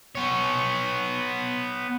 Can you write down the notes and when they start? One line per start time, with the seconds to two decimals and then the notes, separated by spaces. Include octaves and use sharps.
0.15 B3 C#5